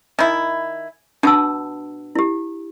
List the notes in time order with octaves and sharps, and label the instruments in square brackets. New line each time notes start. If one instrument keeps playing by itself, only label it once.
[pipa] D#3 E4 [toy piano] G#5
[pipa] B2 [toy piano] D4 A5 E6
[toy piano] E4 G4